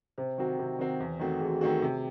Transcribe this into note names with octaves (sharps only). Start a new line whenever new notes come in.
C3 C5
D#3 F#3 C4 F#4
C3
D#3 F#3 C4 F#4
E2
D#3 A3 C4 F#4
E2 G#4
F#4
G#4
D#3 A3 C4 F#4
C3